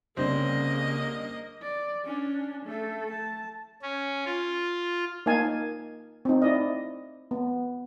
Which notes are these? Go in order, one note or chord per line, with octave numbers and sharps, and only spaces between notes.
C2 C#3 A#3 C4 D4 D#5
D5
C#4 D4
A3 A4
A5
C#4
F4
A#3 D#4 F5 G#5 A5
C4 D#4
E4 D5 D#5
B3